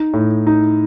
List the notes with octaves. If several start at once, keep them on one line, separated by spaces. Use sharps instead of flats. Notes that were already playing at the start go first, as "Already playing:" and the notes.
Already playing: D#4
A2
D#4